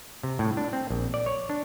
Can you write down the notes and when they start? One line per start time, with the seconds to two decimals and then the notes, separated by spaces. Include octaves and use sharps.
0.23 C3
0.39 A2
0.57 D4
0.73 C4
0.90 A#1
1.14 D5
1.26 C#5
1.50 D4